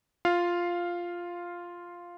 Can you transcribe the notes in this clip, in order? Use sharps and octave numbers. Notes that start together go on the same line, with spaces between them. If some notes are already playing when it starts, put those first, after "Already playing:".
F4 F5